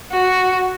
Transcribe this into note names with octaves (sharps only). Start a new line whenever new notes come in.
F#4